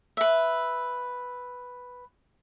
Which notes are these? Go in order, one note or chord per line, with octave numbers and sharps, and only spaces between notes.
B4 E5